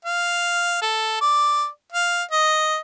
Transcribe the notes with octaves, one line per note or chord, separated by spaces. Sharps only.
F5
A4
D5
F5
D#5